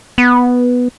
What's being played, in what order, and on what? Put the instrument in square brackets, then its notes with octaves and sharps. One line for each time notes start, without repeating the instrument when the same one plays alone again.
[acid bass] B3